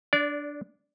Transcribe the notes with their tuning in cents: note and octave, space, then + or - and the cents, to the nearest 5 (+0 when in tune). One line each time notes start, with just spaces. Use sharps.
D4 +0 D5 -25